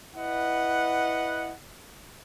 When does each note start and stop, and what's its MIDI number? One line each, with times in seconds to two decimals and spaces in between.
0.16 1.54 64
0.16 1.54 71
0.16 1.54 75
0.16 1.54 78